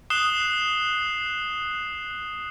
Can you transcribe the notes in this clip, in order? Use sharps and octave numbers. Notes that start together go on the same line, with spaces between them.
D#6 F#6 C7 E7 G7